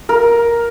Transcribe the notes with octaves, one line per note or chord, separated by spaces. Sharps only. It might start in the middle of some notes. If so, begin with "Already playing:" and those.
A#4